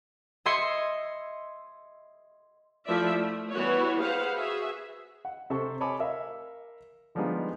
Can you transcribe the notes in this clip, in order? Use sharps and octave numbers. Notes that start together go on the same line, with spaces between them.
D#5 E5 C6 G#6 C#7
F3 A3 E4 D5 E5
A3
E3 G3 B3 F#4 C#5
G#4 B4 C5 F5 F#5
F#4 G#4 E5
F#5
C3 A4 C5 C#6
C#5 D#5 G#5 A5 B5 D6
A#4 E5 F5
D3 F3 G3 G#3 B3 D#4